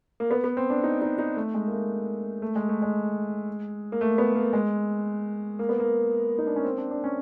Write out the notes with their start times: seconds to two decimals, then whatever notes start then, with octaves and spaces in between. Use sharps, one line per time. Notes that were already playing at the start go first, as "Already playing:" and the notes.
0.20 A#3
0.31 B3
0.44 B3
0.57 C4
0.70 D4
0.84 D#4
1.02 D#4
1.19 D#4
1.36 A3
1.54 G#3
1.67 A#3
1.72 A3
2.42 A3
2.56 G#3
2.69 A3
2.82 G#3
3.92 A#3
4.01 A3
4.18 B3
4.35 A#3
4.53 G#3
5.59 A#3
5.69 B3
5.80 A#3
6.38 D#4
6.47 D4
6.56 C#4
6.65 C4
6.78 D4
6.91 D4
7.04 C#4